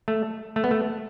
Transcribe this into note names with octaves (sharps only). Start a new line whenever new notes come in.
A3
A3
B3
A3